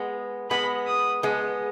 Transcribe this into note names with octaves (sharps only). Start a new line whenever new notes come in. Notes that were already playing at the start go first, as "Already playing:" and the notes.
Already playing: G#3 B3
G#3 B3 B5
D#6
G#3 B3